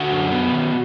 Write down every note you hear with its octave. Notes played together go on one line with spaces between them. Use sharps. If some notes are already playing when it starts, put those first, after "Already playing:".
Already playing: D3 F#4 F#5
F#2
B3
D#3